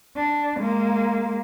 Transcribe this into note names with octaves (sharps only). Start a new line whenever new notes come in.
D4
G#3 A#3